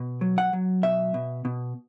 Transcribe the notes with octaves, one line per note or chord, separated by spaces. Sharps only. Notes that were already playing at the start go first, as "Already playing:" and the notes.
Already playing: B2
F#3
F#5
F#3
B2 E5
B2
B2